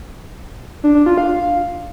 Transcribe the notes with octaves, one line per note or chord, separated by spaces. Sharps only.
D4
D4
F4
F5